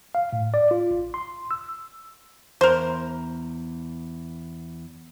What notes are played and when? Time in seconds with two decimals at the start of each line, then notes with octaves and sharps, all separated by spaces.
0.15 F5
0.33 A2
0.54 D5
0.71 F4
0.91 A1
1.14 C6
1.51 E6
2.61 E2 A#4 C5